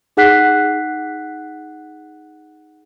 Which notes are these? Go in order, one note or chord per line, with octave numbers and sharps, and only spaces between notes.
D#4 G#4 F#5 F#6 B6 C7